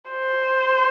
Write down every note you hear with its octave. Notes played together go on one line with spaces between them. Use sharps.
C5